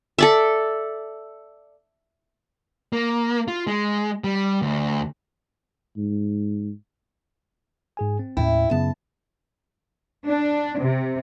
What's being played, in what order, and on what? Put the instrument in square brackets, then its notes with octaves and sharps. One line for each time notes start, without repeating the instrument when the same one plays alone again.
[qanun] A4 D5 E5
[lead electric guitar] A#3
F4
G#3
G3
D2
[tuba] G#2
[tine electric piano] G#2 G#4 G#5
C4
[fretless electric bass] D#2 A2 C#4 [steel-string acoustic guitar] E4 [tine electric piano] G5
[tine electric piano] F#2 C#3 F#3 [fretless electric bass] B3 [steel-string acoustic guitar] A5
[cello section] D4
C3